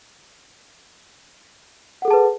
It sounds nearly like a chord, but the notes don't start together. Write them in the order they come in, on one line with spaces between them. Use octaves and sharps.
F#5 A4 G#4 A5 B4